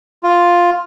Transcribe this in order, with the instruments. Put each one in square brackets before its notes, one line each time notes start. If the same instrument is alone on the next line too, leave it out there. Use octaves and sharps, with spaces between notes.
[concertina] F4